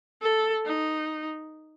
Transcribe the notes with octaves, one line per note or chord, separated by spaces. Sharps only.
A4
D#4